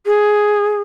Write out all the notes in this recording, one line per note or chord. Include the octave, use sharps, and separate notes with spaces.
G#4